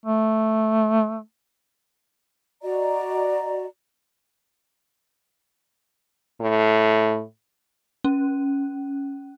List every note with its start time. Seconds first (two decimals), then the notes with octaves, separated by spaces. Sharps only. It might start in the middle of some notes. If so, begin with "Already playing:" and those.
0.06 A3
2.61 F#4 D5 D#5 A#5
6.41 A2
8.04 C#4